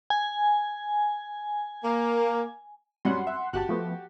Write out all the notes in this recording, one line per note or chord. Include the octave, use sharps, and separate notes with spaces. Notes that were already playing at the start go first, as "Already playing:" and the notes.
G#5
A#3
F#2 G3 C#4 F#5 C6
E5
G1 F#4 G4 A5 F#6
F3 A3 B3